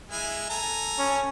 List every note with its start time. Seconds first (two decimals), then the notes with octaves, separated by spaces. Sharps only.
0.11 G#3 E4 G#5
0.50 A4 G#5 A#5
0.98 C#4